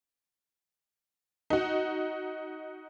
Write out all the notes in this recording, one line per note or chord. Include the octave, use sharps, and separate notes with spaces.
D#4 F#4